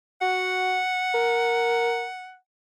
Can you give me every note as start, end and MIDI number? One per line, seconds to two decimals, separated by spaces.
0.21 0.80 66
0.21 2.36 78
1.14 2.06 70